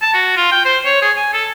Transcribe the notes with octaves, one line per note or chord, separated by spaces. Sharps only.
A5
F#4
F4
G5
C5
C#5
G#4
G#5
A4